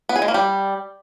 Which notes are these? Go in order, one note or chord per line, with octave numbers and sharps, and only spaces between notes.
B3
G#4
G#3
A#3
G3